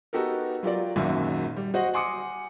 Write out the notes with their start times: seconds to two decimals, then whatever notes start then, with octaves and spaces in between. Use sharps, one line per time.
0.13 B3 D#4 F#4 G4 A4 A#4
0.63 F#3 F4 G4 A#4 D5
0.96 G#1 F#2 A#2 F#4 E5
1.57 G3
1.74 F#4 C5 D#5 F#5
1.93 F#5 G#5 C6 D6 D#6 C#7